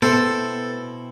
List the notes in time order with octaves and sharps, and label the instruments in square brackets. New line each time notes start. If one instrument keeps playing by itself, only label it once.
[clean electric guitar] B2 C4 E4 [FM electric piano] B3 [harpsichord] A4 [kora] C5